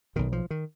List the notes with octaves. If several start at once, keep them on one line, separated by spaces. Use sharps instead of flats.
B1 B2 D#3
F3
D#3